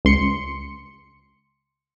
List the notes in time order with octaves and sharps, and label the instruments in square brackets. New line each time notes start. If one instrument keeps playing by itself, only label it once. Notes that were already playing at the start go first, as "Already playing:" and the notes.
[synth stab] C#2 C6 C#7